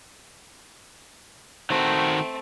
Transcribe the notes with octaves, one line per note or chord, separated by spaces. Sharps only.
D#3 A3 C4 F#4